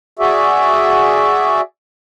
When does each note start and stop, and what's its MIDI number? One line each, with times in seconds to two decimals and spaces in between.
0.19 1.61 66
0.19 1.61 68
0.19 1.61 74
0.19 1.61 76